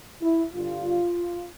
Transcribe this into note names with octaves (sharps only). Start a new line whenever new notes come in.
E4
G2 D3 G3 F4